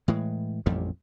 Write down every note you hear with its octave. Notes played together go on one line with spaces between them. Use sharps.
A2 E3 G#3
A1 F2 A#2 G3